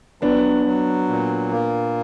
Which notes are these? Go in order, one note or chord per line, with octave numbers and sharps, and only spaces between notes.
F#3 B3 D4
F#3
A#2
A#3